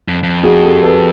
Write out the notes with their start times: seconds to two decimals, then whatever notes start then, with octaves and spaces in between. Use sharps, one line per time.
0.08 F2
0.23 F2
0.43 F#4 G#4
0.63 G4 A4
0.83 A4 B4